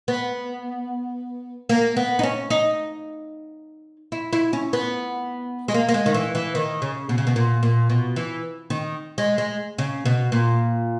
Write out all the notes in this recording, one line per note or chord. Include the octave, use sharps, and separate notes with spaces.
B3
A#3
B3
D#4
C#4
D#4
E4
E4
C#4
B3
G#3
A#3
A#3
G#3
D#3
E3
E3
D#3
C#3
B2
C#3
B2
A#2
A#2
B2
E3
D#3
G#3
G#3
C#3
B2
A#2